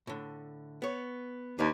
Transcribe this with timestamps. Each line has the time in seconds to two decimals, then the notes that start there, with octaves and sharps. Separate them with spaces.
0.07 A2 D3
0.82 B3 C#5
1.59 D#2 D4 B4 F5